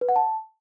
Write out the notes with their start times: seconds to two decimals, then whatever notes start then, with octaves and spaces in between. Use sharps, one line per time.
0.01 B4
0.09 F#5
0.16 A5